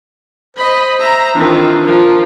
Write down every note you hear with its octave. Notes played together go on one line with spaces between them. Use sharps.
C5 D#5 B5
E5 A#5
D#3 E3 C4 D4 F4
F3 F4 A#4